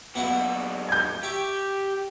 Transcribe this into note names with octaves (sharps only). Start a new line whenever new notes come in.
A#2 F#3 B3 E4 F#4
G6 G#6
G4 E5 C#6 D6